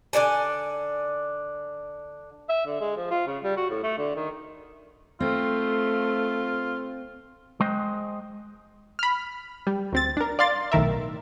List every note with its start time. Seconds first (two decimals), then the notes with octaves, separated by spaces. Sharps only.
0.13 D3 A4 D5 G#5
2.49 E5
2.67 D3
2.81 G#3
2.96 F3
3.10 F4
3.27 C#3
3.43 G3
3.57 F#4
3.70 A2
3.83 A3
3.98 D3
4.16 D#3
5.20 A3 C4 F4
7.60 G#3 C5 D#5 G5
8.99 B5 F6
9.67 G3
9.93 D2 C4 A6
10.17 D4 A#4
10.39 D5 F5 C6 A6
10.72 B1 A2 D#3 A#4 E5